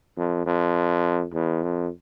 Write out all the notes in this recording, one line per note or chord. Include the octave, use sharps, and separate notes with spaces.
F2
F2
E2
F2